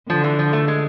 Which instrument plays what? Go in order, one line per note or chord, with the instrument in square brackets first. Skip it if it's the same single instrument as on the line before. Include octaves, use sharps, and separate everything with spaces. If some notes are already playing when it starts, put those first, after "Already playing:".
[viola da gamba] D3 [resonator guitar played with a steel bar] F3
[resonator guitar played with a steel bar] E3
F3
A3
G#3